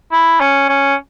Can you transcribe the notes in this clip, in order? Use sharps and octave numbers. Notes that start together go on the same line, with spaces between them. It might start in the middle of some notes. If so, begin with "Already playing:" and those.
E4
C#4
C#4